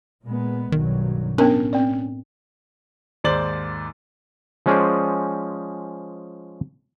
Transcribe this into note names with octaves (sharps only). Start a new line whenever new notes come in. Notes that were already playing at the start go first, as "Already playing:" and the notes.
A#2 G#3 B3
B1 G2 D#3 F#3
A2 B3 C#4 D4 A#4
C4 D5
D#2 G#2 C5 D5 A6 F#7
F3 G#3 C#4 G#4 C5 D5